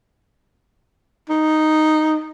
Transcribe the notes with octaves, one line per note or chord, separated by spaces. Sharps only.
D#4